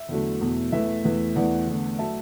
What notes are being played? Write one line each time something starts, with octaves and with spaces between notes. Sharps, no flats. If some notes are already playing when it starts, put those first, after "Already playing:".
Already playing: E5
E2 D3 F#3 A3
E2 B2 A3
E2 E3 A3 E5
E2 E3 A3
E2 E3 A3 D5 F#5
E2 D3 A3
F#3 A3 E5 A5